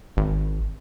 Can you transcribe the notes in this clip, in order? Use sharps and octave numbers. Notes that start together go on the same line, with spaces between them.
G#1